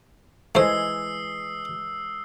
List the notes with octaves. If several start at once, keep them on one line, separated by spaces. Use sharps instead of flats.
E3 G#3 A3 C5 D#6 E6 C7